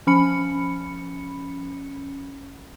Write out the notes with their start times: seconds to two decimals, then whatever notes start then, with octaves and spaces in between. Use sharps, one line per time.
0.07 F3 C#4 B5 C#7